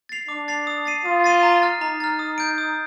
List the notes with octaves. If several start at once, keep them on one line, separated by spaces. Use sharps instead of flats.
A6 C7 F7
D4 D6
A6 C7 F7
D#6
A6 C7 D#7
F4 D#6
A6 C7 D#7
A#5
F6 A6
D#4 A#5
F6 A6
D#6
G6 D7
D#6